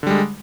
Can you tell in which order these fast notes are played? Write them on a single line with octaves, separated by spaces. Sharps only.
D3 G3 G#3